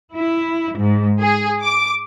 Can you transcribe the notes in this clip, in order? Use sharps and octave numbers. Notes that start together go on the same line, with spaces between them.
E4
G#2
G#4
D6